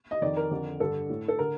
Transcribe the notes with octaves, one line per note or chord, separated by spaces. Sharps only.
D#5
F2 D#3 D5
A#4
F2 D3
G2 D3 A4
A2
A4
D3 A#4